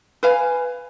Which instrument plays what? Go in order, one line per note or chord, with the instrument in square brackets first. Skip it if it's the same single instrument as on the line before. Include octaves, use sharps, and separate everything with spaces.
[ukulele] B4 F5 G#5